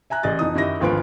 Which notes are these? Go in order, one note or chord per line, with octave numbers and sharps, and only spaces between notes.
E5 G#5 A#5 F#6
A1 G#4 D5 D#5 A6
F2 E3 D#4 D#6
F#2 D#3 E4 G4 D#5 A#6
G#1 D2 F3 F4 B4 D7